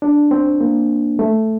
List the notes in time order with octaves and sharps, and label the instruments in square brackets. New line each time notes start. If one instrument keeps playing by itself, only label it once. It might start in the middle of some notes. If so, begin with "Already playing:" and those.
[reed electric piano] D4
C4
A#3
A3